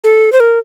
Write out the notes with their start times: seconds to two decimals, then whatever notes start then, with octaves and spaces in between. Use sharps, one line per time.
0.04 A4
0.32 C5
0.40 A#4